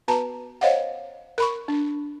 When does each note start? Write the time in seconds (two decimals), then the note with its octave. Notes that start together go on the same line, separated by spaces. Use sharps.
0.08 B3 F#4 B4 A5 A#5
0.61 C5 C#5 D#5 F5 F#5
1.38 A#4 B5 C#6
1.68 D4